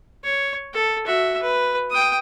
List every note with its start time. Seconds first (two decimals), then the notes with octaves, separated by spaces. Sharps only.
0.24 C#5
0.73 A4
1.07 F#4 E5
1.42 B4
1.90 G5 D#6